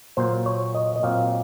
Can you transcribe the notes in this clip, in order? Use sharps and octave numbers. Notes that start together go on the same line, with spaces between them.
A#2 F#3 A#3 C5
C#5
D#5
D#5
A#2 F#3 C4 F5